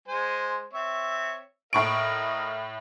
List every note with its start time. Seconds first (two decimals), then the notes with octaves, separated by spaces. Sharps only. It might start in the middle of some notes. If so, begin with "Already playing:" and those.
0.08 G#3 C5 G#5
0.73 C4 C#5 E5
1.73 A2 A#4 D#5 F5 C#6 D7